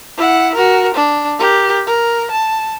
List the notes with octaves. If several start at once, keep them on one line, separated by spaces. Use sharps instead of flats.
E4 F#5
F#4 A#4
D4
G4 A#4
A#4
A5